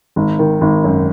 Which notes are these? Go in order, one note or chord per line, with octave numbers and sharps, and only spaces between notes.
G#1
D#3
G#1
F#2